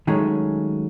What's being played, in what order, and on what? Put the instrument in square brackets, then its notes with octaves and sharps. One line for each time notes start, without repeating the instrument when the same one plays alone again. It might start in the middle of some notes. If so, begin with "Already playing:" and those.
[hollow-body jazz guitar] D#3 F#3 G#3 A3 C#4